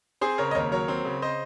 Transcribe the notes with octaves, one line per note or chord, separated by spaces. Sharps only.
C4 G#4 C5
C#3 A#4 C#5
D#5
D#2 A#4 C#5
F#3 A#4 C#5
C4
C#3
C5 D#5